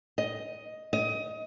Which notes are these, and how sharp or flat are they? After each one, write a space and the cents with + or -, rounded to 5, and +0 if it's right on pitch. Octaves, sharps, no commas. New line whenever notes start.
D#5 +10
D#5 +20